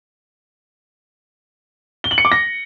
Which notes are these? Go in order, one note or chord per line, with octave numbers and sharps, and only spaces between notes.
G7
F#7
C#7
D6
A#6